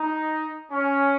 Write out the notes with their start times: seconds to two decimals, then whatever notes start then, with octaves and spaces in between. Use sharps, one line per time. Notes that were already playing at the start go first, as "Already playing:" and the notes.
Already playing: D#4
0.71 C#4